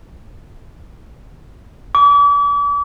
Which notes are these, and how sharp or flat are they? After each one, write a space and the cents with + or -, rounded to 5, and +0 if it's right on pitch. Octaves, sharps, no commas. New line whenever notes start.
D6 -40